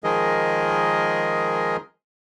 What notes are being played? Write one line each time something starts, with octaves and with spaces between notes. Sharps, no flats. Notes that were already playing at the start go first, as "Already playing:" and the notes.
D#3 F3 G#3 G#4 A#4 D#5